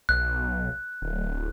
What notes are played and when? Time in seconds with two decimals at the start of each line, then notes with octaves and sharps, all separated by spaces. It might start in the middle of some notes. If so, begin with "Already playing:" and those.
0.09 B1 F#6
1.02 D1